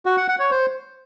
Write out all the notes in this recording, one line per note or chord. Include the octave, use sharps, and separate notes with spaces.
F#4
F#5
F#5
C#5
C5